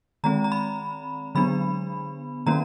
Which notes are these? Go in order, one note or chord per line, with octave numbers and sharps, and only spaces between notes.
D#3 G#3 C4 A#5
A#5
B5
D3 F#3 B3 D4 B5
D#3 F#3 A#3 C#4 A#5